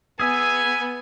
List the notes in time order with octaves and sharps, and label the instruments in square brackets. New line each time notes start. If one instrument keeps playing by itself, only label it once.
[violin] B3 [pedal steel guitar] G#4 E5 [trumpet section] G#5